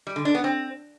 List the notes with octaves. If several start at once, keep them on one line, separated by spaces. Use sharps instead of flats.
G3
D3
D4
B3
C4